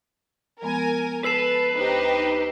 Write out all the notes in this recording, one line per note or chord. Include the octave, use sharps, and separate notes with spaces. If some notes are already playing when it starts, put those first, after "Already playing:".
F3 G#3 B3 A#4 G#5
A4 B4 E6 C7 E7
D2 D#4 G4 C5